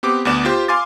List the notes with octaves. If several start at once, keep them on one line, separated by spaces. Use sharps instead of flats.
B3 C4 G4 D6
D2 B3 D5 E7
F4 G4 C5
F5 G#5 C6 D6 A6